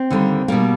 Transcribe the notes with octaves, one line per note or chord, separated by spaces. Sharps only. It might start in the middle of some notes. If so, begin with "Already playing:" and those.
Already playing: C4
D#2 D3 G3 A#3
B2 G3 A#3